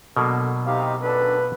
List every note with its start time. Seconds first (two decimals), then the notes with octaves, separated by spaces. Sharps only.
0.17 B2 D3 F#3 A#3 A4
0.66 C3 D#4 G4 F5
1.02 F#2 D#3 D4 A4 B4